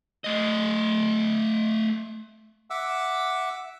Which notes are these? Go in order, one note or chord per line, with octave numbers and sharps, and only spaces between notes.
A3 D#5
E5 F#5 D6 E6